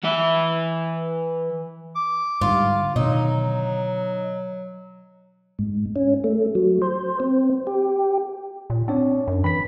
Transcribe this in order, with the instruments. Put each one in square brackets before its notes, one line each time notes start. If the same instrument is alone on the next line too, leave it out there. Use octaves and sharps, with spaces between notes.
[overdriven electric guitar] E3 E5
[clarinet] D6
[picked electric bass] G#2 D3 G3 [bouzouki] F4
[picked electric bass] B2 D3 D#3 [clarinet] F#3 [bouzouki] D#4
[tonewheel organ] G#2
C#4
A3
F#3
C5
C4
G4
[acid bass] A#2
[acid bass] C4 [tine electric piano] D4 C#5
[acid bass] F#2
[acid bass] E3 [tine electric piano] B5 B6